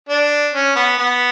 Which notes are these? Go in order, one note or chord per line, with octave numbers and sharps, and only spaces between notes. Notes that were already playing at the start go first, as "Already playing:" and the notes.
D4
C#4
B3
B3